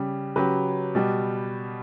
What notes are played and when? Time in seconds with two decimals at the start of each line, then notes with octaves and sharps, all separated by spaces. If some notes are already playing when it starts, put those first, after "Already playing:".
Already playing: C#3 G3
0.36 C#3 F#3 G4 B4
0.95 B2 G3